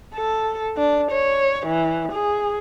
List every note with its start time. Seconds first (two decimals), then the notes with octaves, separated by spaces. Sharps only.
0.15 A4
0.77 D4
1.12 C#5
1.67 E3
2.12 G#4